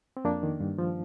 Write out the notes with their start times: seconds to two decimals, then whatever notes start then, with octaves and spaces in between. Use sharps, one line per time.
0.17 C4
0.25 F2 A#3 D4
0.43 D#3
0.60 G2
0.78 F3